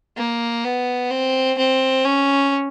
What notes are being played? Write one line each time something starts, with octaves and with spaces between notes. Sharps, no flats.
A#3
B3
C4
C4
C#4